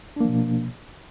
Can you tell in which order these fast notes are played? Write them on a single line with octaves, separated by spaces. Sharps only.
D4 A#3 F3 B2